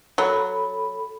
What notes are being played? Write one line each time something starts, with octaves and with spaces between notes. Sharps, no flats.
F#3 A4 B5